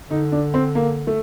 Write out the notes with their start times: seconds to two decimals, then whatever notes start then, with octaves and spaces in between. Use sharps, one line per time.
0.10 D3 D#4
0.32 D4
0.54 C4
0.75 A#3
1.07 A3